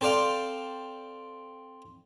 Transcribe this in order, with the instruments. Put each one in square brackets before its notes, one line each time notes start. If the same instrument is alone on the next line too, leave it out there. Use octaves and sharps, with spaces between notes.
[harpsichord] C4 A4 C5 D5 F5 G5